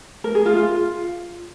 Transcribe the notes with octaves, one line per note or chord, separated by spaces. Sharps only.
A#4
G#4
F4
F4